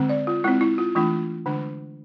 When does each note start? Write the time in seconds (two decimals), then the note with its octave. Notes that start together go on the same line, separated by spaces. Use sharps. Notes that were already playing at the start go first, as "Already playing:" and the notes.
Already playing: D3 G#3 C4
0.09 D5
0.27 F4
0.44 G#3 C4 E4
0.61 E4
0.78 F4
0.95 E3 A3 D4 F4
1.46 D3 G#3 D4